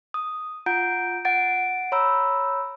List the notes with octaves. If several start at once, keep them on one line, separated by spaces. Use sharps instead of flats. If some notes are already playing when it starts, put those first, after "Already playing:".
D#6
F4 F#5 A#5 G6 D7
F#5 A6 D7
C#5 A#5 B5 E6